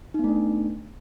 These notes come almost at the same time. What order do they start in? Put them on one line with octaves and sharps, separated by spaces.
D#4 B3 A3 D4